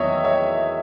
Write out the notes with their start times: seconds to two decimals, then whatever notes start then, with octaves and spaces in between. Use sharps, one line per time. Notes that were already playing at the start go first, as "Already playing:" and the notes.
Already playing: E2 D#3 F#3 C#5 D#5 E5
0.24 C#5 E5